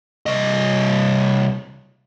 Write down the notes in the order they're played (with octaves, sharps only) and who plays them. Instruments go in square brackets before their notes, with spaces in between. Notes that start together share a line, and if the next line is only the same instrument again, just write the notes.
[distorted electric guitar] C2 D#5